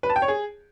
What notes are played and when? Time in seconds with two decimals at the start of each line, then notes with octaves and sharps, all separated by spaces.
0.03 B4
0.10 A5
0.16 G5
0.22 C#5
0.28 G#4